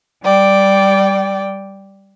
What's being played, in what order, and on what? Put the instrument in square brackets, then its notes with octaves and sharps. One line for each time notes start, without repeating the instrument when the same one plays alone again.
[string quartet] G3 D5 G5